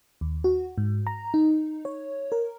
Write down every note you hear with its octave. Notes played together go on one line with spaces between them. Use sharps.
D#2
F#4
G#2
A#5
D#4
C#5
A#4